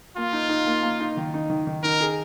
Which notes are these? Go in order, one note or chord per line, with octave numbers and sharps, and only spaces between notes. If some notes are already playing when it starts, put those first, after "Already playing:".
A#3 F4
D#4
D#4
A#3
A#3
D#4
D#3
D#4
D#3
D#3
D#4 A#4
G#4